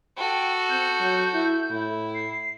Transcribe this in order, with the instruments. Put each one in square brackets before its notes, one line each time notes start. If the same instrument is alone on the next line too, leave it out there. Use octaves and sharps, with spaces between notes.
[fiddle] F#4 A4 [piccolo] G5
[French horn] C4 [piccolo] G6
[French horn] F#3
E4
[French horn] A2 [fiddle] E4
[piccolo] C7